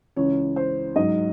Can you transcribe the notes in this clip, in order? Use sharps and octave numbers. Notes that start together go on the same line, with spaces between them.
C#2 C#3 E3 C#5
C5
G#2 F#3 D#5